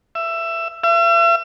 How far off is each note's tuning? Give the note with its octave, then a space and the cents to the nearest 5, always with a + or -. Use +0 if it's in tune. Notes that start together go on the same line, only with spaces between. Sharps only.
E5 +20
E5 +45